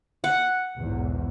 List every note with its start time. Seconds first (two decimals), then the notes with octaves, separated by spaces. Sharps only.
0.24 F#5
0.78 B1 E2 G#2